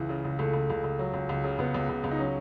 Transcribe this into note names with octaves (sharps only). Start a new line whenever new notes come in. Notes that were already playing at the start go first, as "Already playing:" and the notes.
Already playing: C#2 E3
C#3
C#2
C#2 A3
C#2
C#2
C#2
F#3
C#2
C#2
C#3
C#2 B3
C#2
C#2
C#2
D#4
F#3 C#4